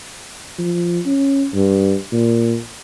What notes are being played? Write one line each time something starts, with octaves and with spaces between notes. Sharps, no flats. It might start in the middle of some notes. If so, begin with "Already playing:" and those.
F3
C#4
G2
A#2